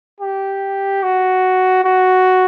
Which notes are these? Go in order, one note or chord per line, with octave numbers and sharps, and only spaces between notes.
G4
F#4
F#4